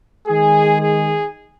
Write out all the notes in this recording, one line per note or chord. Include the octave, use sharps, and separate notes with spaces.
D#3 G#3 G#4
G#4